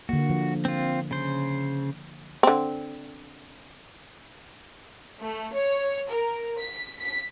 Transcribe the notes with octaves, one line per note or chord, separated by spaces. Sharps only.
D3 A#3 F#4
F3
C4 F4
C#3 C5
D3 C4
A3
C#5
A#4
B6
B6